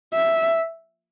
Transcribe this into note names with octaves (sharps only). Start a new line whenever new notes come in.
E5